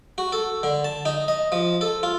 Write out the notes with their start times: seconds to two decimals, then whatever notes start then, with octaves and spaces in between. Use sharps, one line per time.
0.18 F#4
0.32 A4
0.63 D3
0.84 A5
1.05 D#4
1.28 D#5
1.52 F3
1.81 A4
2.03 F4